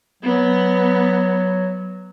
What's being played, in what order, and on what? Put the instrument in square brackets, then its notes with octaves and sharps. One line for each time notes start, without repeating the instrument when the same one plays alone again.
[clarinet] F#3 [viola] B3